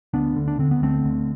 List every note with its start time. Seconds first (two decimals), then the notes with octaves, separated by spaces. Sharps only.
0.14 D2 B3 D4
0.36 D3
0.48 D4
0.59 D3 C4
0.71 B3
0.82 D2 A3 C4
1.04 D2